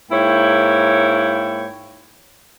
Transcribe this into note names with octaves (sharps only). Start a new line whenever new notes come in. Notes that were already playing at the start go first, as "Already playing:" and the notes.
G#2 A#3 E4 C#5 G5